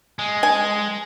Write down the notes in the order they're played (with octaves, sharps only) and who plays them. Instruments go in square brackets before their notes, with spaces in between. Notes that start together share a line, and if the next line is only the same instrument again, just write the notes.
[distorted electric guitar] G#3
[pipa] G#5